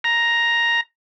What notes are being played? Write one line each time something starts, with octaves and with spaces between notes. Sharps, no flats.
A#5